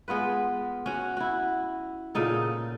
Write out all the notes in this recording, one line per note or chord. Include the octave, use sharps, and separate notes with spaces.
G#3 B3 F4 B4
C#4 F#4
E4 F#4
A#2 C#3 D#4 A4